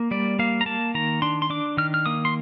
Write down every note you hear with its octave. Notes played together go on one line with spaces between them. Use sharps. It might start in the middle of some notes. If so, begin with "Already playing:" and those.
Already playing: A#3
G3 D5
A#3 F5
A#5
A#3 A5
D#3 A#5
D4 C6
C6
D4 D6
D#3 F6
F6
A#3 D#6
C6